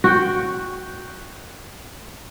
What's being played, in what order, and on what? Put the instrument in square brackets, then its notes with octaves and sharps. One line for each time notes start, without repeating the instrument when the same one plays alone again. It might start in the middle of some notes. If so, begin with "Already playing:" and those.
[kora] F#4 F#5 G5